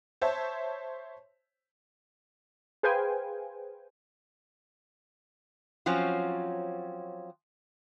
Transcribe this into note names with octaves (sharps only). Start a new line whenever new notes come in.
C5 C#5 E5 A5
G#4 B4 C5 F5 G5 G#5
F3 F#3 C4 C#4 F4